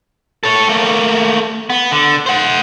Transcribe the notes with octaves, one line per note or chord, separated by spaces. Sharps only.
A4 C#5
A3 A#3
B3
D3
C5 F#5